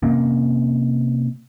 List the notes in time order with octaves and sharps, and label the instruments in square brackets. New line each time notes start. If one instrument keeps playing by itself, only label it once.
[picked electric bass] C3 A#3 C4 C#4